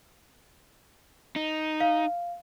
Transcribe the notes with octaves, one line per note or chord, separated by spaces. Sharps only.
D#4
F5